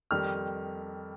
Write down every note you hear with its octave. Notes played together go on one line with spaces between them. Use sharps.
F2 D#3 G3 F6